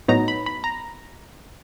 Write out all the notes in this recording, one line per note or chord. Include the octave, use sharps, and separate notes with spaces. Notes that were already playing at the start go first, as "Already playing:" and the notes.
A2 F#3 B3 D#4 A#5
B5
B5
A#5